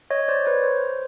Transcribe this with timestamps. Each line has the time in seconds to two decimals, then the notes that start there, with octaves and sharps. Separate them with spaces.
0.10 C#5 D#5
0.28 C5 D5
0.46 B4 C#5
0.64 C5
0.81 C5